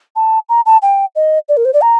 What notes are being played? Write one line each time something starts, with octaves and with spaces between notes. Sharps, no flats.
A5
A#5
A5
G5
D#5
D5
A#4
C5
D5
A#5